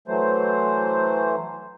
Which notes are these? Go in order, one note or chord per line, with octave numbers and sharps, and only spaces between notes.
E3 F#3 A3 C5